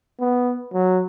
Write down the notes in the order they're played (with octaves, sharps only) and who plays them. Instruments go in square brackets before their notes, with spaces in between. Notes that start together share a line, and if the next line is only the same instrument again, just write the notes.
[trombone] B3
F#3